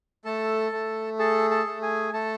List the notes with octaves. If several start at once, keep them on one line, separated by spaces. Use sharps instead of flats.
A3 A4 A5
A3
G#4 A4 A5
A4 A5
A3
G#4 G#5
A3 A4 A5